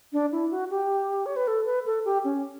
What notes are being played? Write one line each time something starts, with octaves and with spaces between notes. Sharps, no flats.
D4
E4
F#4
G4
C#5
B4
A4
B4
A4
G4
C#4